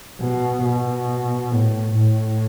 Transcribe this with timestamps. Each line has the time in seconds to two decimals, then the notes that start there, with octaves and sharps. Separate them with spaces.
0.21 B2
0.64 B2
1.52 A2
1.96 A2